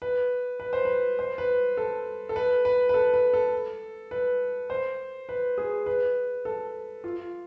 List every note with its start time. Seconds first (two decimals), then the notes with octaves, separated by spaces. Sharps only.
0.02 B4
0.60 B4
0.73 C5
0.85 B4
1.19 C5
1.38 B4
1.77 A4
2.29 A4
2.36 B4
2.65 B4
2.89 B4
2.94 A4
3.14 B4
3.33 A4
4.11 B4
4.70 C5
5.29 B4
5.58 G#4
5.86 B4
6.45 A4
7.04 F4